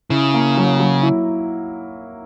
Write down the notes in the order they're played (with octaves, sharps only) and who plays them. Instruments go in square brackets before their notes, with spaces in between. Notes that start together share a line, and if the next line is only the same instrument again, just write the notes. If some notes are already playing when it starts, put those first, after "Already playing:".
[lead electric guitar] C#3 [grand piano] E4
[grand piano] A#3
F#3
F#3
E4